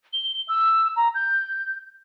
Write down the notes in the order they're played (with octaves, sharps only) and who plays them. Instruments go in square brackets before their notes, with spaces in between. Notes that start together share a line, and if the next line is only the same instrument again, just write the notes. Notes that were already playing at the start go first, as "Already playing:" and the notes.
[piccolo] G7
E6
A#5
G6